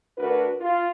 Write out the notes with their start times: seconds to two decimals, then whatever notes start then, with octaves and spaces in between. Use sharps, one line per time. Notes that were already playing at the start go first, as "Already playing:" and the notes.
0.17 D2 D4 F#4 A#4 B4
0.60 F4